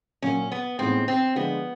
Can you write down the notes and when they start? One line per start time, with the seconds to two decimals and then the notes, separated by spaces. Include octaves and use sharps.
0.22 A#2 F#3 A#3 C#4
0.52 B3
0.79 A2 E3 G#3 B3 C4 D#4
1.08 C4
1.36 D3 F3 G#3 B3